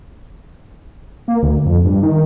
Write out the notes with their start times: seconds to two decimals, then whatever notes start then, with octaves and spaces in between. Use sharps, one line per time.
1.28 A#3
1.43 D2
1.66 F2
1.85 G2
2.03 D#3